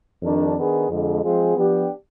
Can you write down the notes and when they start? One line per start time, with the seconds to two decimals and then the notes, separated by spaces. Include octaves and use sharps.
0.22 F2 D#3 G3 D4
0.56 D#3 B3 D4 G#4
0.89 F2 D3 G#3
1.22 F3 G#3 C4 F4 G#4
1.56 F3 B3 D4 G4